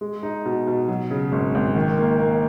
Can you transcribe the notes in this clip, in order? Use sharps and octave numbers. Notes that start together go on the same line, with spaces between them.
G#3
D#4
B2
B2
F#3
C#3
G#1
G#1
D#3
A#3
A#3